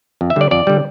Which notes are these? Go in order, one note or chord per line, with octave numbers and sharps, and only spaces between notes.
F2
E5
D3 G3 D5
F2 D5
D3 G3